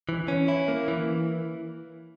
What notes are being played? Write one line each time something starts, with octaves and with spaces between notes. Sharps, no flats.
E3
C#4
E4
A#3
E3